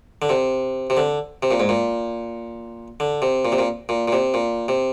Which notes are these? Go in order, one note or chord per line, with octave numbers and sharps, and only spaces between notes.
D3
C3
C3
D3
C3
A#2
G#2
A#2
D3
C3
A#2
C3
A#2
A#2
A#2
C3
A#2
C3